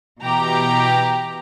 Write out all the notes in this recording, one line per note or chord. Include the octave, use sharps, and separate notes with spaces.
B2 E3 G4 A#5